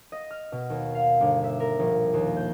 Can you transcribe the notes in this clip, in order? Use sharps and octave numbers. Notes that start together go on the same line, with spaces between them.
D#5
F6
B2
D#2
F5
G1
E5
A#4
A#1
D#2
G6